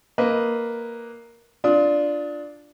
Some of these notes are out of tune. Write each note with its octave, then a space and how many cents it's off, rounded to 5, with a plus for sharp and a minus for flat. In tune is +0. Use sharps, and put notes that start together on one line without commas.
A#3 +0 B4 +0 D#5 +10
D4 +0 F4 +0 D#6 +30